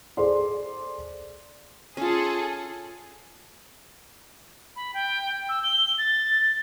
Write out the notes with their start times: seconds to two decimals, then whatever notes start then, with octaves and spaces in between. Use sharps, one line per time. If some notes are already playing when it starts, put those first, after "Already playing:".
0.17 G#4 A4 C5 D5 C6
1.97 C#4 F4 G#4 A4
4.76 B5
4.94 G5
5.49 E6
5.63 G7
5.98 A6